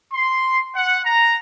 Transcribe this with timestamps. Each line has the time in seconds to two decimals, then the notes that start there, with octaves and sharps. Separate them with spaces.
0.13 C6
0.75 F#5
1.05 A#5